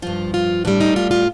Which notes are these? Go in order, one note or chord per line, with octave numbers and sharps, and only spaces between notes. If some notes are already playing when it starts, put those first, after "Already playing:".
G2 F3 F4
F4
A2 G3 D4
D#4
F4
F4